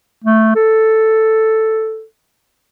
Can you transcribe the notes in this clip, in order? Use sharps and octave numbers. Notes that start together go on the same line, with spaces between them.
A3
A4